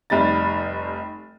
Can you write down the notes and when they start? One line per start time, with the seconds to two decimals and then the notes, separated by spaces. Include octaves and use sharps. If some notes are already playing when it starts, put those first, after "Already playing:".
0.10 F1 G3 D#4 A6